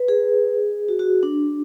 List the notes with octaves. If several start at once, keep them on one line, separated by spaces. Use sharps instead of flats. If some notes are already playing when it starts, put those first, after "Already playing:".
Already playing: B4
G#4
F#4
F#4
D4